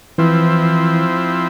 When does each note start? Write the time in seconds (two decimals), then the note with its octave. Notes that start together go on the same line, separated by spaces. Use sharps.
0.18 E3 F3 C4 E4